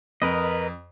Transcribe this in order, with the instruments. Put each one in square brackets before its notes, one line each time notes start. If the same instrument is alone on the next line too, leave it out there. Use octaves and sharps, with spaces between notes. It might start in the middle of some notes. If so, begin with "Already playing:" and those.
[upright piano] F2 [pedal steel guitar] A#4 B4 D#5